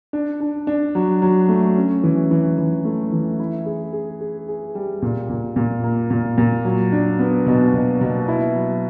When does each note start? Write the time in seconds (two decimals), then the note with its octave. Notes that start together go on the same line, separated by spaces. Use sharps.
0.13 D4
0.40 D4
0.67 D4
0.95 F#3
1.22 F#3
1.49 A3
1.76 C#4
2.04 E3
2.31 E3
2.58 E3
2.85 A3
3.12 E3
3.39 E4
3.66 G#4
3.93 G#4
4.21 G#4
4.48 G#4
4.75 G3
5.02 A#2
5.29 A#2
5.56 A#2
5.84 A#3
6.10 A#2
6.38 A#2
6.65 F#3
6.92 D4
7.19 B3
7.47 B2
7.73 B2
8.01 B2
8.28 E4
8.55 F#3